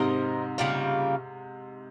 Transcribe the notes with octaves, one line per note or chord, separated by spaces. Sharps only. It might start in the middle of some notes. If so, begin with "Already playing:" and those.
Already playing: G#2 C3 C4 D#4 A#4 D#5
C#3 G3 A#3 F4